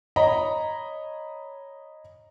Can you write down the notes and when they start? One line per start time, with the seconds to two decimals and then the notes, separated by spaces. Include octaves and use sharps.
0.16 C#5 D#5 A#5 B5